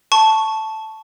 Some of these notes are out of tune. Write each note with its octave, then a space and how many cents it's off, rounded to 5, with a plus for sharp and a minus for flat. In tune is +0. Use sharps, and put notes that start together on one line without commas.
A5 +0 C#6 +0